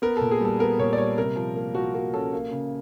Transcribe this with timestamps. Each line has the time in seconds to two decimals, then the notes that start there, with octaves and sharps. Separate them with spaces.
0.02 B3 A#4
0.17 A#2 A4
0.31 G#4
0.41 G3 A4
0.59 B3 A#4
0.79 A#2 C#5
0.93 D5
0.98 G3 C#5
1.18 C3 A#4
1.36 F3
1.56 A#3
1.75 F3 F#4
1.94 A#3 F#4
2.14 C#4 A4
2.33 A#3
2.51 C#3